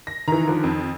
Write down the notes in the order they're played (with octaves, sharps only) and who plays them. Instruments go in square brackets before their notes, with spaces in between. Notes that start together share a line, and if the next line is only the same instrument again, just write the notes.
[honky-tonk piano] A#6
[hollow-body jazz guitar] D#3 [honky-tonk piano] E3 A#5
[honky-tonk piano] D3 F3
F2